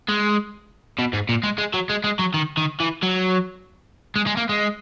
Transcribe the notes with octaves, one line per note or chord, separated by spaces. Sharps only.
G#3
B2
G#2
A#2
G#3
G#3
F#3
G#3
G#3
F#3
D#3
D#3
E3
F#3
G#3
G#3
A#3
G#3